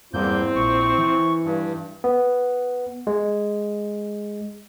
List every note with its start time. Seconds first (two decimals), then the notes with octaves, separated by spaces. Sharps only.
0.14 E2 G2 A#3 C4 E4 G6
0.55 A#1 C#6
0.98 E3
1.44 G2
2.04 B3
3.07 G#3